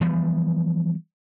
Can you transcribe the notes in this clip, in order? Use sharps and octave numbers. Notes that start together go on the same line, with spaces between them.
E3 F3 G3 B3